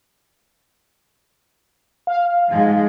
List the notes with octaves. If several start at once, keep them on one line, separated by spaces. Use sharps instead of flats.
F5
G#2 F3 G#3